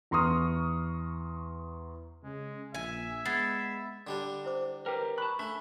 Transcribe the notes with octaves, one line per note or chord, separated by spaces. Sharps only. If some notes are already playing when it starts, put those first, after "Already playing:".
E2 A#5 C6 C#6 D#6 F6
C#3 G#3
A#1 E5 G#5
G#3 B3 G#6 A6 C7
D3 G3 D4
E4 C5 D6
G4 A#4 B4 G5 A#5
A5 B5 C#6 F#6
A3 D4 E5